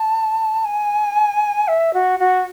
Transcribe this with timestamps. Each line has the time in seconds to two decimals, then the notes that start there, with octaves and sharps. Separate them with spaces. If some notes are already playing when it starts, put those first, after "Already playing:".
Already playing: A5
0.65 G#5
1.68 E5
1.94 F#4
2.20 F#4